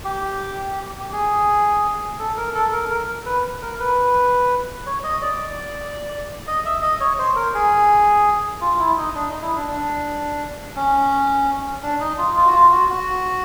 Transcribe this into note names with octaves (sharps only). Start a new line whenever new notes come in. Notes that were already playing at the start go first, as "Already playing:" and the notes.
G4
G4
G#4
A4
A#4
A4
A#4
A#4
B4
A#4
B4
C#5
D#5
D5
D#5
E5
D#5
C#5
C5
A#4
G#4
F4
E4
D#4
D4
D#4
E4
D4
D4
C#4
D4
D#4
F4
F4
F#4
F4
F#4
F#4